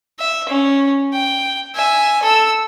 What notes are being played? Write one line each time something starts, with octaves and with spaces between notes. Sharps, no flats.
E5
C#4
G5
E5 G#5
A4 E6